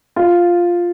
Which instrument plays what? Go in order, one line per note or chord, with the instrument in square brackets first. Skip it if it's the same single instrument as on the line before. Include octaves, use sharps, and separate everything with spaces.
[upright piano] F4